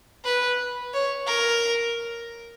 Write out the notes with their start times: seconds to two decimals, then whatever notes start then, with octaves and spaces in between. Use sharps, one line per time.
0.25 B4
0.94 C#5
1.28 A#4